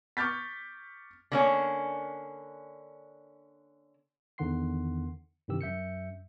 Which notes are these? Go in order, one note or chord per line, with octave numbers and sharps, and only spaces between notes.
C#6 D6 F6 G6 A6 B6
D3 A#3 C#4
E2 D3 D#3 F#5 C6 C7
G2 C3 D#3 E3 G4 E6
F#2 E5 G6 C#7